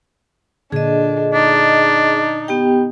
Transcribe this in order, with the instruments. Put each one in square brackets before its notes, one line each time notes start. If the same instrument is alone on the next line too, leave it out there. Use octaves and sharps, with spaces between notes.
[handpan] A#2 D3 [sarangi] D4 [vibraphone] G#4 D#5
[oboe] D4 [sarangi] D#4
[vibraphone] B3 G4 G5